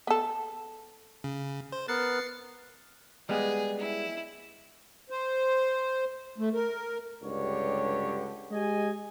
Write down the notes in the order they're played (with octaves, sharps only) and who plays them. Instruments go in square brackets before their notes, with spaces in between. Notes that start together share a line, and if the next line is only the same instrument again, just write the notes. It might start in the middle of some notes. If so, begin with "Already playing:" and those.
[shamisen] B3 A4
[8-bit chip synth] C#3
C5
[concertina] B3 A#4 F#6 [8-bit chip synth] A6 C7 C#7
[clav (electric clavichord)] G3 G#3 B3 [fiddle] G#4
[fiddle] E4
[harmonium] C5
A3
A#4
[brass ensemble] C#2 G2 D3 G4 C#5
G#3 G4 D#5 G#5